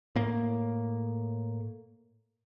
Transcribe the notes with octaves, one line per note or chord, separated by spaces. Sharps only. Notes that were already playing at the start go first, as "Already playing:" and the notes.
A2 A#3